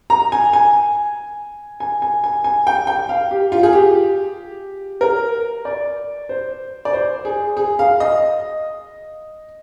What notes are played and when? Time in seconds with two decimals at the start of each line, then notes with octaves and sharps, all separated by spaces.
0.10 A#5
0.32 G#5
0.53 G#5
1.80 G#5
2.02 G#5
2.24 G#5
2.44 G#5
2.67 G5
2.87 G5
3.09 F5
3.31 G4
3.52 F4
3.63 G#4
3.73 G4
5.01 A#4
5.65 D5
6.29 C5
6.85 D5
6.93 C5
7.25 G#4
7.57 G#4
7.79 F5
8.00 D#5